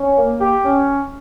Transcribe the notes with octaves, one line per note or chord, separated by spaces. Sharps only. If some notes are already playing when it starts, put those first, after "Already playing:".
Already playing: C#4
A#3
G4
C#4